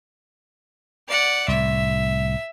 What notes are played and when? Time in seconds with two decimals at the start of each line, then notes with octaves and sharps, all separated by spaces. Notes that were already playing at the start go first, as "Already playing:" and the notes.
1.08 D5 F#5
1.48 C2 A2 E5